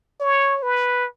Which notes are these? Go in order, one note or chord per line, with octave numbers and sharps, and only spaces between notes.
C#5
B4